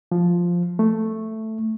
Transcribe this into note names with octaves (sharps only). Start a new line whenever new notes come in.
F3
A3